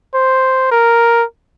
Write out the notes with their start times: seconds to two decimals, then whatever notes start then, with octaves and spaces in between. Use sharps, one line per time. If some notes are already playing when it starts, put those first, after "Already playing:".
0.14 C5
0.71 A#4